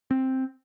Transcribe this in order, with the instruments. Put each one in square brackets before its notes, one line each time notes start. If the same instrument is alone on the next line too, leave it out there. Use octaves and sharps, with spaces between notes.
[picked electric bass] C4